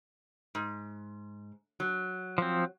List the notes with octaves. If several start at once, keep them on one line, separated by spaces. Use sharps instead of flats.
G#2
F#3
F3 C4